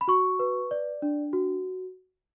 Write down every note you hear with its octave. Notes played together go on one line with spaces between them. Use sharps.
B5
F#4 C#6
B4
D5
D4
F#4